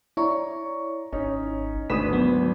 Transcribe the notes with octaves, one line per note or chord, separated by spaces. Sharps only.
E4 C#5 D5 A#5 C#6
G#1 C#4 D#4
G#1 D2 B4 D#6 B6 E7
F#3 B3